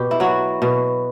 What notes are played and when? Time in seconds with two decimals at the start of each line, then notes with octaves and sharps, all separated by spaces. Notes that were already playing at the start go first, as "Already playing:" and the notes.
Already playing: B2 G4
0.11 E4
0.20 F#3 F#4
0.62 B2